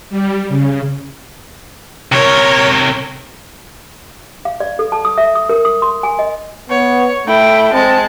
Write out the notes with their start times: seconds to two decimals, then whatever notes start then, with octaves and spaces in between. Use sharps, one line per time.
0.10 G3
0.49 C#3
2.12 C3 A#4 C#5
4.45 F5
4.60 D5
4.79 A4
4.92 A5
5.05 D#6
5.18 E5
5.35 D#6
5.49 A#4
5.65 D#6
5.82 C6
6.03 G#5
6.19 D#5
6.70 B3 C#5
7.27 A3 E4 G5
7.73 G#3 C4 A5